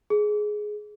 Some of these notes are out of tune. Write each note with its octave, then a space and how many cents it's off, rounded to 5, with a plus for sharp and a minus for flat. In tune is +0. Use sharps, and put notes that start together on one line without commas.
G#4 +10